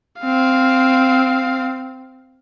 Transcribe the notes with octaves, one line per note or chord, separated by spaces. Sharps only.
C4 F5